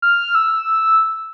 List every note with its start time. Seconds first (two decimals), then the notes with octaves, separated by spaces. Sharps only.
0.02 F6
0.35 E6